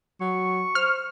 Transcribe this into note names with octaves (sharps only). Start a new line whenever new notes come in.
F#3 C#6
C5 F6